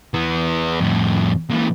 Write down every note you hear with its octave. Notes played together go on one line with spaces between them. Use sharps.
E3 B3
F2 A2
A#2 E3